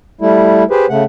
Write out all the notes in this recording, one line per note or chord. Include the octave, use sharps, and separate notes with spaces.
G3 A3 E4
G4 G#4 B4 C5
C#3 A3 F#5